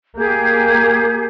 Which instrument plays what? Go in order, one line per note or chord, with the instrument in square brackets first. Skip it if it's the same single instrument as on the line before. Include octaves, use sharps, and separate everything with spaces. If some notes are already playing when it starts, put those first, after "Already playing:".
[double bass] A#3 [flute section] G4 G#4 G6